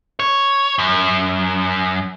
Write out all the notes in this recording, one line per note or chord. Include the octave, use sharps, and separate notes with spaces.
C#5
F#2